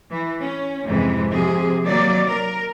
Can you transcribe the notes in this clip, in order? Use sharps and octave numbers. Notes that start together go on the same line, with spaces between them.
E3
C#4
F2 G#2 C3 E3 G#3
C3 F3 G#4
D#3 F#3 A#3 D5
A#4